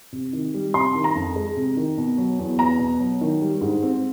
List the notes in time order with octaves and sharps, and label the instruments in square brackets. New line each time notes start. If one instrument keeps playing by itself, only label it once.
[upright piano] C3
D#3
G3
C3 C6
D#3
A#5
F2
G#3
C3
D#3
B2
F#3
E2
B3 A#5
B2
F#3
D#3
G3
G#2
C4